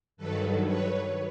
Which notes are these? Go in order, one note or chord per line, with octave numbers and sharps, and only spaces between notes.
G2 D#3 F#3 A4 B4
B4 C#5